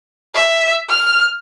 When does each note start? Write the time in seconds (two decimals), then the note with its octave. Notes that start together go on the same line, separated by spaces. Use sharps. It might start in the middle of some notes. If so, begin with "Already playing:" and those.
0.35 E5
0.90 F6